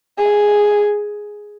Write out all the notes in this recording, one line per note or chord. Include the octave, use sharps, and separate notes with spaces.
G#4